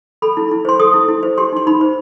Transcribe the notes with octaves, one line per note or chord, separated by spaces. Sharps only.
A4 B5
E4
E4
C5 C6
A4 D#6
E4
E4
C5
G4 C6
D#4 C6
D#4 B5
C5